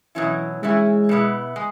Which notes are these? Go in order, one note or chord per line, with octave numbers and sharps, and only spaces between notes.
B2 E3 F#3 C#4 E4
E3 G#3 C#4 E4
B2 B3 E4
G#3